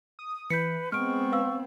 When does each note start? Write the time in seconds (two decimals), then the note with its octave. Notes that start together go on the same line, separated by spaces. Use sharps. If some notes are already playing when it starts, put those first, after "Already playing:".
0.19 D#6
0.50 E3 B4 G6 B6 C#7
0.92 G#3 B3 C4 C#6 F6 D7
1.32 B4 F5 E6